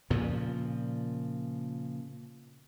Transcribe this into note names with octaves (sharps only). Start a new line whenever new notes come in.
A#2 C#3 F3